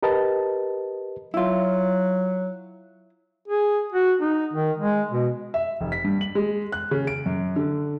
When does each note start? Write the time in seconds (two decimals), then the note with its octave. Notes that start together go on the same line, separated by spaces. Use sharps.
0.03 G4 A#4 B4 D#5 A5
1.34 F#3 E4 F4
3.48 G#4
3.92 F#4
4.21 D#4
4.53 D#3
4.78 G#3
5.11 B2
5.54 E5
5.81 F1
5.92 B6
6.04 G2
6.21 F#7
6.35 G#3
6.72 F#6
6.91 C#3
7.07 D7
7.26 F#2
7.56 D3